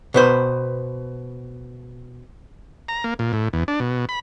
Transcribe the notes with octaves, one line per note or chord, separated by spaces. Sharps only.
B2 B4 C5
A#5
A#3
A#2
A2
E2
D4
B2
B5